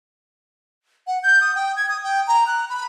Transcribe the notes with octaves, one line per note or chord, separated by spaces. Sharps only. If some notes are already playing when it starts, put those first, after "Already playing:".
F#5
G6
D#6
G5
G#6
D#6
G5
A#5
F#6
B5